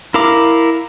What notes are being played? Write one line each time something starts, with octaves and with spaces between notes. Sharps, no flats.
E4 A#4 F5 A#5 D6